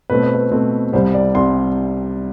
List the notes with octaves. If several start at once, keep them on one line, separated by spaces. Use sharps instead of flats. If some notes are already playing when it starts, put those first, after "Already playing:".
B2 A3 C4 B4
C5
B4
B2 A3 C4
C2 C3 G3 C5
D5
C2 C3 G3 C6